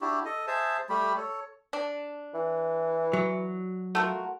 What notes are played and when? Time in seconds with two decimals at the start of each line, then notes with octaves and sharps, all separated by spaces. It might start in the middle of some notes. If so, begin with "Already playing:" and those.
0.01 D4 E4 F#4 G4
0.25 A4 D#5
0.47 G#4 C5 E5 A5
0.89 G3 A3 G4 B5
1.17 A4 C#5
1.73 D4
2.34 E3
3.13 F#3
3.95 A3 F4 F#4 A#4